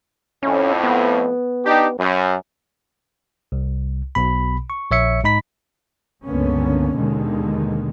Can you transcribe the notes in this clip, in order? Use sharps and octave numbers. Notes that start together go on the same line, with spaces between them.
F2 A2 C#4
B3
D4 D#4 G4
F#2
C2
B1 B2 B5
C#6
A#1 C#5 E5 C#7
G#2 D#4 B5 B6
C#2 G2 D3 A#3 B3 C#4
D#2 B2 D3 D#3 G#3